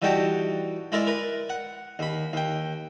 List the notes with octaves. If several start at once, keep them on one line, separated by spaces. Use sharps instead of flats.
E3 G3 D#4 F#4 G5 A5
G#3 E4 A#4 D5
A#4 B4
F#5
D#2 B5
D#2 G5